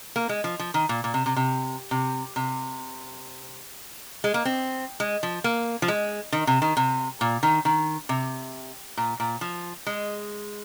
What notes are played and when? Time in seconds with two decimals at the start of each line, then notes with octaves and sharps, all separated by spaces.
0.16 A#3
0.29 G#3
0.44 F3
0.59 F3
0.74 D#3
0.89 A#2
1.04 A#2
1.14 C3
1.26 C3
1.36 C3
1.91 C3
2.36 C3
4.24 G#3
4.34 A#3
4.45 C4
5.00 G#3
5.23 F3
5.44 A#3
5.82 F3
5.88 G#3
6.32 D#3
6.47 C3
6.62 D#3
6.77 C3
7.21 A#2
7.43 D#3
7.65 D#3
8.09 C3
8.97 A#2
9.20 A#2
9.41 F3
9.87 G#3